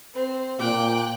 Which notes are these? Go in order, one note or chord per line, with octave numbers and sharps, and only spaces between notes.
C4 C5
A#2 G5 D6 F#6